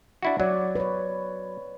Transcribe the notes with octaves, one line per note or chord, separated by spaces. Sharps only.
D4 E4 F#4
F#3 C#5 D5
B4 C#5